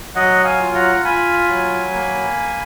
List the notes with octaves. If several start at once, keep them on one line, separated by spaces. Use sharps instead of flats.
F#3 D#5 F#5
F5 G#5
F4
F#5 A#5
F4 G#5 B5
F#3
A#3